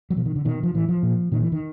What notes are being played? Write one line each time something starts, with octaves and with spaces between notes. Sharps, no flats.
F#3
B2 F3
D#3
D3
B2 D#3
F3
A2 E3
F3
A#2
A#2 D#3
E3
D#3